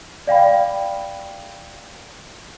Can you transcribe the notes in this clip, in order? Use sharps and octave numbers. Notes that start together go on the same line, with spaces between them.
D5 F5 G5 B5